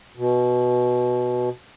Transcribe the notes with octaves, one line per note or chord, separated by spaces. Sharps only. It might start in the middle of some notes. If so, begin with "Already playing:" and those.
B2